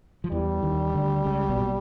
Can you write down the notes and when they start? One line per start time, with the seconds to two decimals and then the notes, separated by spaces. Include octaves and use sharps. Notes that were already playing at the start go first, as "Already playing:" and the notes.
0.24 F3
0.32 E2 E3 G3
0.63 D#2 D#3
0.94 D2 D3
1.25 C#2 C#3
1.49 B1 B2
1.61 A#2